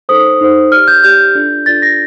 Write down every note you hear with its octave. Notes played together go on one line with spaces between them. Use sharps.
D#4 A4 C5 D#6
D#4 A4 C5
G4 D5 F6
G6
G4 D5 G6
D4 F4 A4 D5
D4 F4 A4 D5 A6
A#6